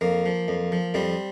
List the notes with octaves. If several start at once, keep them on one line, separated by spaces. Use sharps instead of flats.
F2 A#3
F3
F2
F3
F2 G3 C4